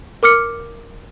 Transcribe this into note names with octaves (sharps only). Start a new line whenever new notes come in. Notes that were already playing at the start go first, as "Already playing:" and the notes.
A#4 D6 F6 C#7